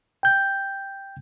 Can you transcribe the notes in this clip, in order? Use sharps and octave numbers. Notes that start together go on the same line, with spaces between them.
G5 G6